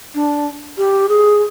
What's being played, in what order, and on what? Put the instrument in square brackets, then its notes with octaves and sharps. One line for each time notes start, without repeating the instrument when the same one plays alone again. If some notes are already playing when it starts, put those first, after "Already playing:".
[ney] D4
G4
G#4